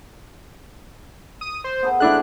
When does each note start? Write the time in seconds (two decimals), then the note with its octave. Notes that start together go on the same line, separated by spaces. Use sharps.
1.41 D#6
1.64 C5
1.83 B3 G#4 A4
2.00 G#3 A3 D4 E4 F#6